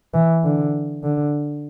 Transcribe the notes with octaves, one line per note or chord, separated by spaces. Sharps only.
E3
D3
D3